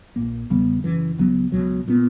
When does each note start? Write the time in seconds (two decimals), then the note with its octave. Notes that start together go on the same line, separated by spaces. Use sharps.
0.16 A#1 A#2 A#3
0.50 E2 C#3 G3 B3
0.84 F#2 C#3 E3
1.18 C#2 C#3 F#3 B3
1.52 C#2 B2 F#3
1.88 A#2 G3 B3